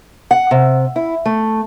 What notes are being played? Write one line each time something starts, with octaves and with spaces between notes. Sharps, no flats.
F#5
C3
E4
A3